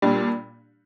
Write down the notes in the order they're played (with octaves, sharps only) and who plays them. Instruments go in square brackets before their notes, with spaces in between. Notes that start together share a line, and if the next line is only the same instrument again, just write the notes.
[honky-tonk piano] A#2 G3 D4